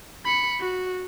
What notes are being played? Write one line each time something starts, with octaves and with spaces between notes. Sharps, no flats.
B5 C#7
F#4